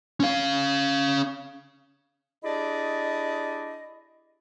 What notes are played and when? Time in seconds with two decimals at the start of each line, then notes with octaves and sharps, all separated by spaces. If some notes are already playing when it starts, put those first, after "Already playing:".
0.20 C#4 F5
2.43 D4 E4 G4 G#4 D5 D#5